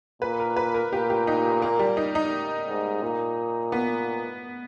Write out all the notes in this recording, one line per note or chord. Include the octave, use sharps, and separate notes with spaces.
A#2 B4
A#4
B4
A#4
A#2 G4
G4
D#4
A#3
G3
D#4
D#4
G#2
A#2
B3